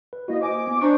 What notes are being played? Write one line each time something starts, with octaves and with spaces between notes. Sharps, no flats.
B4
A#3 E4 F#4 D#5
C5 D#5 G#5 D6
B3
D4 C5 A#5 C#6